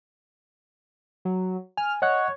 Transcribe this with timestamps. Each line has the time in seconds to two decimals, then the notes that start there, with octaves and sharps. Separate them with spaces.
1.25 F#3
1.77 G#5 F6
2.02 C#5 D#5 F#5 F#6